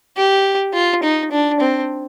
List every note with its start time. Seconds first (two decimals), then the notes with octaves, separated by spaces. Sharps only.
0.17 G4
0.74 F4
1.03 D#4
1.31 D4
1.60 C4